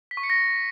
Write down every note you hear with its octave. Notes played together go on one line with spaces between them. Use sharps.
B6
C#6
C#7
A#6